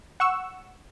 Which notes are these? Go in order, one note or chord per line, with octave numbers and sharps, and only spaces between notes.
F#5 C#6 E6